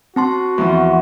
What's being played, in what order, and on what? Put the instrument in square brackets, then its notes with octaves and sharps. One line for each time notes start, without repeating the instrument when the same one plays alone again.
[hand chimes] C4 A5 C6 [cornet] F#4
[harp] E2 F3